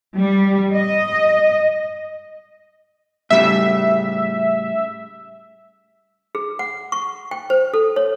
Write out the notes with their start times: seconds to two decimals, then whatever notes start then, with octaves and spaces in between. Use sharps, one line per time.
0.17 G3
0.75 D#5
3.30 A2 C#3 G3 E5
6.35 G#4
6.59 F#5
6.92 C#6
7.31 G5
7.50 C5
7.74 A4
7.96 C#5